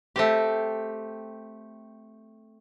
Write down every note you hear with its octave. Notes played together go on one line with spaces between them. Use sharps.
A3 C4 G4